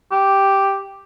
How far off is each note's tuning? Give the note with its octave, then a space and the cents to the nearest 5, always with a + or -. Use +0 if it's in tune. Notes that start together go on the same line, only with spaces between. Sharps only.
G4 +0